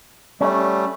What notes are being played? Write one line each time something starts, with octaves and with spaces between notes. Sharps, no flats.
G3 A3 C#4